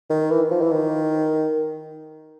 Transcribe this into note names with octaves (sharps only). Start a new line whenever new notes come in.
D#3
E3
F3
E3
D#3